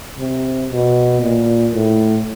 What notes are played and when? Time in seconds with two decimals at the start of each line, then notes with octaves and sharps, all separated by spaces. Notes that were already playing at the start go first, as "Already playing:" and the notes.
0.18 C3
0.70 B2
1.22 A#2
1.73 A2